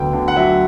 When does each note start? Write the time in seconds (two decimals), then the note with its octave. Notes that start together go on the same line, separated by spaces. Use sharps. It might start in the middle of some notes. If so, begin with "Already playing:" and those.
Already playing: D2 F#3 B3 G5
0.13 D3
0.28 F#5
0.36 F#3 E5